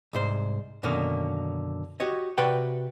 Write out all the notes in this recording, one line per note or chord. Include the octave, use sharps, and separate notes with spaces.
C2 G#2 C5
F#2 B2 D3 D#3 A#3 C#4
F#4 G4 C#5 D#5
C3 F#4 B4 D5 F#5 G5